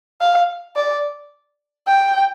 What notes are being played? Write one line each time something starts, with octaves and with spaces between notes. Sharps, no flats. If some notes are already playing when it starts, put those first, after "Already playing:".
F5
D5
G5